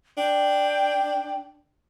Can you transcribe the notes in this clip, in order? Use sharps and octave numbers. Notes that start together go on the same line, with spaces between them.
D4 G5